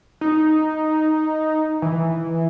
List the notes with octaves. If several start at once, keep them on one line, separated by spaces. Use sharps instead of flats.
D#4
E3